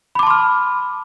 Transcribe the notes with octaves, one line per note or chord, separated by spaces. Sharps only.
A5 B5 C6 D6 F6